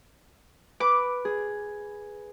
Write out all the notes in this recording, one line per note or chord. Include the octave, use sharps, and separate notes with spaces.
B4 D6
G#4